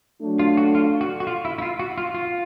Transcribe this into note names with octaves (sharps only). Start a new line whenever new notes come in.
F#3 A3 D4
F4
F#4
F4
F#4
F#4
F4
E4
E4
F4
F#4
F4
F4